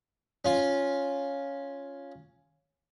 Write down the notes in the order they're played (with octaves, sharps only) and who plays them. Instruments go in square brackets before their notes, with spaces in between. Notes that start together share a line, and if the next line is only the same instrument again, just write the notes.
[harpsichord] C#4 F4